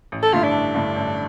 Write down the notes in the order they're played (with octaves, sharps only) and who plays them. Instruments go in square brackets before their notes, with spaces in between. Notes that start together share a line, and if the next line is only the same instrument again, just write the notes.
[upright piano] A1
[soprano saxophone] A4
[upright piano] G2 D3 A3 E4 [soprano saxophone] F4
[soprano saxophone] D4
[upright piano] A1
G2 D3 A3 E4
A1